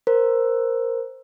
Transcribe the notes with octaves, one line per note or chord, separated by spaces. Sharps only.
A#4 C5